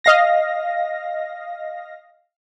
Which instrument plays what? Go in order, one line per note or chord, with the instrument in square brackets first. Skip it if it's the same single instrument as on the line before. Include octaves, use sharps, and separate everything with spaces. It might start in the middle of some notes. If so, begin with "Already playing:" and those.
[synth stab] D#5 F5 A#6